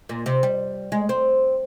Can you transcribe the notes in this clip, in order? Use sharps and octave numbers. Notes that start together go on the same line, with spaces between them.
A#2
C3
G3
G#3
C4